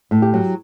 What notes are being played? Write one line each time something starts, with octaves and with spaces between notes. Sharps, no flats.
A2
G4
F#3